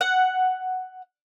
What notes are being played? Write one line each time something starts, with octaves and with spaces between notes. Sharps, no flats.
F#5